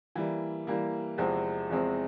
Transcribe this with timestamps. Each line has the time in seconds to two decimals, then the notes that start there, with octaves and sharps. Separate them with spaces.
0.16 E3 G3 A#3
0.67 E3 G3 A#3
1.18 E2 C3 F3 G#3 C4
1.70 E2 C3 F3 G#3 C4